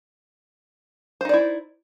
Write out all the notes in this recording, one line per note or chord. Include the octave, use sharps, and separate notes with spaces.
D#4 E4 C5 D5